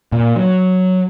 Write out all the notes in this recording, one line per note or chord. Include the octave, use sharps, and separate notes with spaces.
A#2
F#3